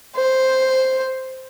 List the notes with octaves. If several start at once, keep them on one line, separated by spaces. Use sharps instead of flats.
C5